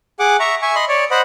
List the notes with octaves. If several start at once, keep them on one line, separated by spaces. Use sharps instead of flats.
G#4 F#5 D6
E5 A#5 C#6
E5 G#5 C#6
D#5 B5 C6
C#5 D5
C5 D#5 F#5 B5